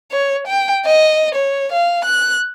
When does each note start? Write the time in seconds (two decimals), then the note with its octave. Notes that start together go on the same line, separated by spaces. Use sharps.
0.11 C#5
0.47 G5
0.86 D#5
1.35 C#5
1.73 F5
2.05 F#6